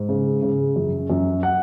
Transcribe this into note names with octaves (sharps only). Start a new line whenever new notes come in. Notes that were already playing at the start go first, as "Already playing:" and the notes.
Already playing: G#2
C#3
C#3
F#2
F#2
F#5